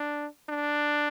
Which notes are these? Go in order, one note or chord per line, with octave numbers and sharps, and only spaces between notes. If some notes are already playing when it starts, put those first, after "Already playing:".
Already playing: D4
D4